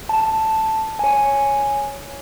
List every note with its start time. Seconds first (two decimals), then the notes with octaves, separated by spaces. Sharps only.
0.09 A5
0.99 C#5 G#5